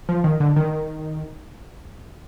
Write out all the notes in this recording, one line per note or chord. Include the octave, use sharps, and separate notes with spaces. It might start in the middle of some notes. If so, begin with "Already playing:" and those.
F3
D#3
D3
D#3